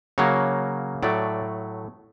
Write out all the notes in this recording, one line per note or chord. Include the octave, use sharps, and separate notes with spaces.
C#3 F#3 A#3 C#5
A2 F#3 A3 D5